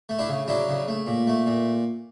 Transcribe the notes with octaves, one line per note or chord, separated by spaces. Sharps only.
A3
D4 E4
C#3
F#3 D4 E4
C#3
A3
A#2
A3
A#2